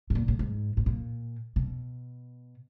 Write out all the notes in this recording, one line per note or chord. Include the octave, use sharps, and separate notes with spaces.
A2
A#2
A2
G#2
A2
A#2
B2